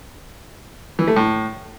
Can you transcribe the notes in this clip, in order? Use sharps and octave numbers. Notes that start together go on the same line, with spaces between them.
E3
A3
A2